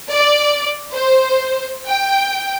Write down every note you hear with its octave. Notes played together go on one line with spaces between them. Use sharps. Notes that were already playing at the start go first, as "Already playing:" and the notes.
D5
C5
G5